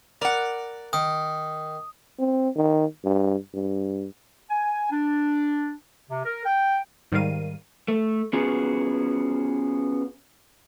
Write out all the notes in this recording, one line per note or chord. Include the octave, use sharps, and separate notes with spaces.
A#4 D5 F#5 D6
D#3 D#6
C4
D#3
G2
G2
G#5
D4
C3
A#4
G5
G#2 D#3 G3 A#4 F5 D#7
A3
B3 C#4 F4 F#4 G#4